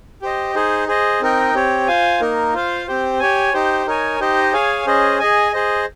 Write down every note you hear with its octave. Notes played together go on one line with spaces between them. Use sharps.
G4 C5 D#5
D#4 G#4 C5
G#4 C5 D#5
C4 D#4 A#4 D#5 G5
C4 G4 C#5
F4 C5 F5 G#5
A#3 D#4 A#4
F4 C5 F5
C4 G4 C5
G4 C#5 G#5
D#4 G4 C5
D#4 A#4 C#5 G#5
D#4 G4 C5 D#5
G#4 C#5 F5 G#5
C#4 G#4 C5 D#5
G#4 D#5 G#5
G#4 C5 D#5